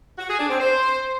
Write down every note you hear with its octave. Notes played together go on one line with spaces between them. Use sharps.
F#4
G#4
D4
C4
C5